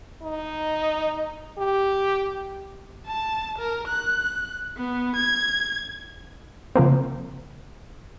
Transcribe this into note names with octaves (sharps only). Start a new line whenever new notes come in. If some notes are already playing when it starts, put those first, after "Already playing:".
D#4
G4
A5
A#4
F#6
B3
G#6
C#3 F3 A#3 C4